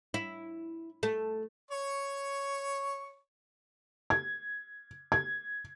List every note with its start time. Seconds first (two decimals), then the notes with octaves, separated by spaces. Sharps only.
0.14 E4
1.03 A3
1.71 C#5 C#6
4.10 G#6
5.12 G#6